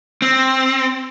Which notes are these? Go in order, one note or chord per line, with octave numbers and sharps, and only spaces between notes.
C4